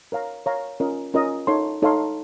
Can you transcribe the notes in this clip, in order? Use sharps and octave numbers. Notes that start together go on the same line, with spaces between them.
A#4 C#5 F5 A#5
A#4 C#5 F5 A#5
C#4 F4 A#4 D#5
C#4 F4 A#4 D#5
D#4 A4 C#5 F5 C6
D#4 A4 C#5 F5 C6